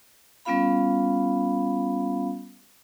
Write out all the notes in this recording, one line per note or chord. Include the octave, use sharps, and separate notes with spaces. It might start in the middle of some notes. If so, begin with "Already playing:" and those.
G3 B3 C#4 F4 F5 B5